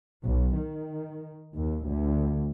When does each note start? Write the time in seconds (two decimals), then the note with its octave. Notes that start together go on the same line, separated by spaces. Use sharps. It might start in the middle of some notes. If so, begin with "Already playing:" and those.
0.25 B1
0.57 D#3
1.56 D#2
1.90 D2